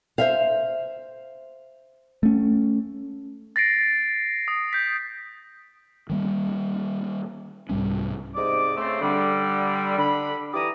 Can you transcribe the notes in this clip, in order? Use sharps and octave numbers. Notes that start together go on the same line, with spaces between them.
C5 E5 F5
A3 C#4
A6 A#6 C7 D7
D#6
G6 B6
D#3 G3 A#3
C2 G#2 G3 C#4
G#2 C3 D5 D#5 D6
C#3 A3 C4
D3 G3
D3 B5
E3 G4 D5 A#5 D#6